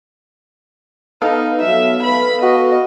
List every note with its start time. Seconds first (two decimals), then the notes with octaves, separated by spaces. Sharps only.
1.22 B3 D#4 A4 F5
1.62 F#3 E5
2.03 B4 B5
2.42 F#4 D#5